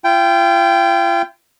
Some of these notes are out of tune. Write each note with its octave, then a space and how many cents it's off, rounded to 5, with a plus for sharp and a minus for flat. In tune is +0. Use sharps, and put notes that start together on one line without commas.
F4 -40 G5 +0